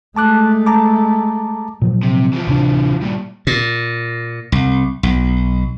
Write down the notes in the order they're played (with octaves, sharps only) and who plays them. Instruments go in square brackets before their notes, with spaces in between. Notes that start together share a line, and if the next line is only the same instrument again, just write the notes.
[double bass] G#3 A3 [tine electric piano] A5 D6 F#6
[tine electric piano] A5 A#5 D6
[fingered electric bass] A#2 F3 F#3
[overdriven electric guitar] C3
E3 F3
[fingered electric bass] D1 C3 D4
[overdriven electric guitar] G2 A#2
[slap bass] A#2
C2
B1